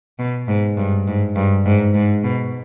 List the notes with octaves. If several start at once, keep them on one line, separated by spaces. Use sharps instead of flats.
B2
G#2
G2
G#2
G2
G#2
G#2
B2